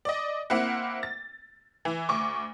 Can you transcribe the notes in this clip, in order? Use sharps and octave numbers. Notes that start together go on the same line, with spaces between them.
D5 D#5
A#3 C4 E4 F#5
A6
E3
D2 C#6 D6